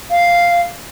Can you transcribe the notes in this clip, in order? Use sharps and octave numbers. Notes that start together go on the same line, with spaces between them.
F5